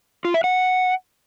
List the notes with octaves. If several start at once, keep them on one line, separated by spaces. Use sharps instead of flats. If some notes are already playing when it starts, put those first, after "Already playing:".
F4
E5
F#5